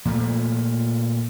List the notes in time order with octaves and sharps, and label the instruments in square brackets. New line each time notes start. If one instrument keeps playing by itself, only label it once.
[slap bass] A#2 F3 A3